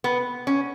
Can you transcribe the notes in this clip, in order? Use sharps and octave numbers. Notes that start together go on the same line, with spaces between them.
B3
C#4